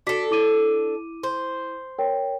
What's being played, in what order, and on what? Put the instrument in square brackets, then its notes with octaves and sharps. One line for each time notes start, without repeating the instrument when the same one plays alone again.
[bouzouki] D4 A4 [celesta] F#4 D6 B6
[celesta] E4 D6 D#7
[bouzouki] C5
[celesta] A#4 C#5 G5